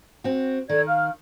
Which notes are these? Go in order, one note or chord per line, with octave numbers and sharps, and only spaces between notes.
C4 F#4
D#3 A4 D5 G#6
F5 F6